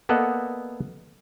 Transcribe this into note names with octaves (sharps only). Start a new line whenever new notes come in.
A#3 B3 A4 D5 D#5 F#5